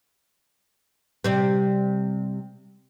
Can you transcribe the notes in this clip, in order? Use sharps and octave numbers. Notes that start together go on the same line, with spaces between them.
C3 G3 C4